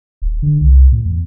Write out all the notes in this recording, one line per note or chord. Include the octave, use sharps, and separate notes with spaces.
D#1
D3
C2
A2
E2